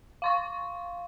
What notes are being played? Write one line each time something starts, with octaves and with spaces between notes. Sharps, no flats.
F5 C6 C#6